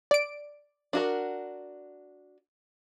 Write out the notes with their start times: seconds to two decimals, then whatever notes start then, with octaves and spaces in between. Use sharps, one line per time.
0.11 D5 D7
0.93 D4 F#4 A#4